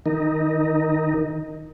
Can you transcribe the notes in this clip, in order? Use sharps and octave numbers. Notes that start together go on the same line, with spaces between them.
D#3 D#4